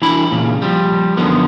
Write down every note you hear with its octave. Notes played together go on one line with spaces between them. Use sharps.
E3 D4 E4 B5
A#2 C#3
F3 G3
F#2 D3 D#3 F3 B3